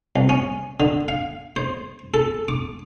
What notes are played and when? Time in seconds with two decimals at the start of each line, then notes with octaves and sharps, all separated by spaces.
0.16 C2
0.29 C#4
0.80 D3
1.08 F5
1.56 C5
2.14 A4
2.48 D6